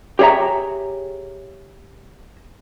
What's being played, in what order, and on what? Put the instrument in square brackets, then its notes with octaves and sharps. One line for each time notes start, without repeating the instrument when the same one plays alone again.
[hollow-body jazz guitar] G4 G#4 C#5 E5 A#5